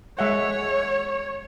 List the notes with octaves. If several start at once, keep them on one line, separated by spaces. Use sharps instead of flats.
G#3 C#5 E5 F#5